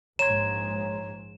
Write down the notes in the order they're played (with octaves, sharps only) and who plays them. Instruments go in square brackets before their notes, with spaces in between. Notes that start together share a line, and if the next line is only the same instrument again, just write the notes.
[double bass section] A#1 G#2 [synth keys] C#5 C6 [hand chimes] A#5 G#6 [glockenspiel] E7